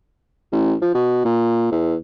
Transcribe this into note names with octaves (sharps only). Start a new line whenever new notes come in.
A1
F3
B2
A#2
E2